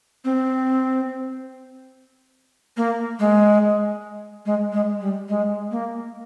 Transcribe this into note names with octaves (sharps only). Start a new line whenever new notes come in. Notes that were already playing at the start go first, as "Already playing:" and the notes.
C4
A#3
G#3
G#3
G#3
G3
G#3
A#3